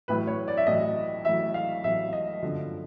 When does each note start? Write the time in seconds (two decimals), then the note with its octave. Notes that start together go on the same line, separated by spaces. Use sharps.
0.08 A1 A2 F#3 B4
0.27 C#5
0.48 D5
0.57 E5
0.67 A1 A2 F#3 D#5
1.25 A1 A2 F#3 E5
1.54 F5
1.84 A1 A2 F#3 E5
2.13 D#5
2.42 G1 F#2 D3 F3